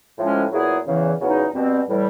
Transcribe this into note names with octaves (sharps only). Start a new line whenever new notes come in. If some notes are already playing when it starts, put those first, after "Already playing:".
A2 F3 G#3 C#4
A#2 F#3 B3 E4 G#4
E2 C#3 E3
E2 C#3 F#3 B3 D#4
B2 G3 C4
A2 E3 G3